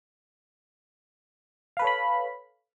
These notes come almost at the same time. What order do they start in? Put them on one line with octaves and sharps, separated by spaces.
F5 B4 A4 C#5 B5